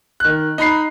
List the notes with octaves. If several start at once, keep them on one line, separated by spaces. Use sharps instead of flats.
D#3 F#6
D#4 A#5 B5 C7